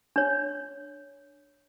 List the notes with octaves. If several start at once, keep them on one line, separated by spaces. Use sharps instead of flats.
D4 C#5